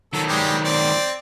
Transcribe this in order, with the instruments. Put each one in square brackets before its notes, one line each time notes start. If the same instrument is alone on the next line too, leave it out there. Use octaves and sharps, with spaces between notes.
[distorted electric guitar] D#3 F#3 [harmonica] A4
[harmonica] G3 G#3 G4
C4 D5